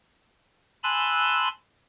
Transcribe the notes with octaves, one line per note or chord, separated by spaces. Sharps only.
G#5 A5 B5 C6 E6 F#6